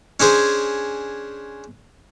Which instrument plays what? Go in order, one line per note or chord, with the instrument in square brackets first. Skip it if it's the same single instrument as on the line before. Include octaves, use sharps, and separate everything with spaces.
[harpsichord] C#4 D4 G#4 C5